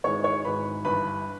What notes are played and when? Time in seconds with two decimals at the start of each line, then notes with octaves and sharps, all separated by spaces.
0.04 G#1 G#2 E3 G#3 C#5 C#6
0.24 C#5 C#6
0.45 G#1 G#2 E3 G#3 B4 B5
0.85 G1 G2 E3 B4 B5